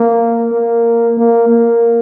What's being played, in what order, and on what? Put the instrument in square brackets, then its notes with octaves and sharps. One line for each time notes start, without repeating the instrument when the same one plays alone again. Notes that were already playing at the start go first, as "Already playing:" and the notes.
Already playing: [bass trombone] A#3
A#3
A#3
A#3